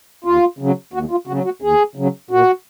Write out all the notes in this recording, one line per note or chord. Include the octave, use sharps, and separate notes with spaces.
D#2 F4
C#3 F#3
D#2 F#4
F4
C#3 F#3 F#4
F#4
D#2 G#4
C#3 F#3
A#2 F#4